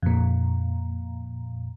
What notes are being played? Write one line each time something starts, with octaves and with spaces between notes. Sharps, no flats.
F2 A#2